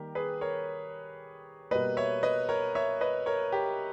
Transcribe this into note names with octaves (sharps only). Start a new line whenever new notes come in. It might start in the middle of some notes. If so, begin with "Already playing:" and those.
Already playing: D#3 G3 A#3 G4 A#4
G#4 B4
A#4 C#5
B2 G3 A#3 B4 D#5
C#5 E5
B4 D#5
A#4 C#5
C#5 E5
B4 D#5
A#4 C#5
G4 A#4